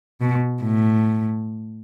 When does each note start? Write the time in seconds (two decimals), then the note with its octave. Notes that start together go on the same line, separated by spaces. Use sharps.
0.21 B2
0.62 A2